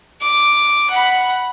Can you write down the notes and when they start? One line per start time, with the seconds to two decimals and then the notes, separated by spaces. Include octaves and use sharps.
0.21 D6
0.90 F#5 B5